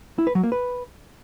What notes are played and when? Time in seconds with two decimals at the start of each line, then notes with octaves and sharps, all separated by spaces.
0.18 E4
0.27 B4
0.35 F#3
0.43 A#3
0.52 B4